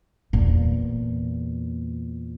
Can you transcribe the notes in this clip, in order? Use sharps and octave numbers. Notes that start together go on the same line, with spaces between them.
E2 A#2